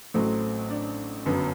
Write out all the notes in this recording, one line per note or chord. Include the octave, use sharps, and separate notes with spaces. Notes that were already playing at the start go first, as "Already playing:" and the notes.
A1 A2 F#3 A3 C4
D4
G1 F#2 F#3 B3